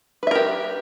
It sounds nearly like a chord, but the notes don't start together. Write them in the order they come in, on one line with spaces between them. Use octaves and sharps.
B4 E5 A#4 G4